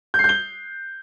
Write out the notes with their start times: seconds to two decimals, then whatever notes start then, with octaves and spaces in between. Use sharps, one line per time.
0.14 G6
0.19 C7
0.24 G6
0.29 G7